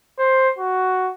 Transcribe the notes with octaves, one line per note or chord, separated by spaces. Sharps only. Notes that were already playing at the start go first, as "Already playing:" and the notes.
C5
F#4